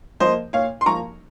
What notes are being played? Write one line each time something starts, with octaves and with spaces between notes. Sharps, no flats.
F3 A#3 C5 D#5
A#2 C#5 F5
C6
F3 A#3 A#5 C#6